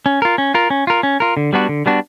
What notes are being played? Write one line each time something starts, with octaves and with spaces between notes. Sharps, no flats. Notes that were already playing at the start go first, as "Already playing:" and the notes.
C#4
F4 A#4
C#4
F4 A#4
C#4
F4 A#4
C#4
F4 A#4
D3
G3 B3 D4 F#4
D3
G3 B3 D4 F#4